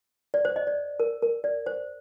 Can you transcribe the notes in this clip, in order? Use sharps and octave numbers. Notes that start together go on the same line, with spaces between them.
D5
C5
D#5
D5
A#4
A#4
D5
C5